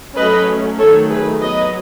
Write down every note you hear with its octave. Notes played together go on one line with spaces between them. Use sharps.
F#3 A3 C#4 B4 D#5
D#3 F#3 A3 A4 C#5
G#4 B4
F#3 B3 B4 D#5